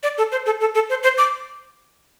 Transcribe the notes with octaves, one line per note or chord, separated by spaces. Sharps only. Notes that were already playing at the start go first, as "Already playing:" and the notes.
D5
A4
C5
A4
A4
A4
C5
C5
D6